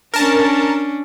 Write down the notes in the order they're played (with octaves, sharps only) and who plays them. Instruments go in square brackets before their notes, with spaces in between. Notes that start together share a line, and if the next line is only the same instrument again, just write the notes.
[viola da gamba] C#4 D4 [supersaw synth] A#4 A5